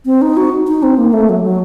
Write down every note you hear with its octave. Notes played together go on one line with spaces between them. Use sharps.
C4
D#4
F#4
D#4
C4
A#3
A3
F#3
F#3